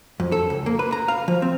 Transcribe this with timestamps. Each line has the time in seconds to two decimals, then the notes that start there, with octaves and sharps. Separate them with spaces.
0.20 F2
0.32 A4
0.50 C#2
0.66 A#3
0.79 B4
0.92 A#5
1.08 F5
1.28 F3
1.42 C4